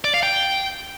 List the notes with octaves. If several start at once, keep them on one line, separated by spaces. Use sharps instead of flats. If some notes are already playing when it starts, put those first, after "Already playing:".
D5
F5
G5